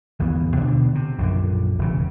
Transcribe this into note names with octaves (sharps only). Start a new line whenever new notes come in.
G1 D#2 E3 B3
B2 D3 B3 D4
C3
A#1 F#2 D3
E1 C#3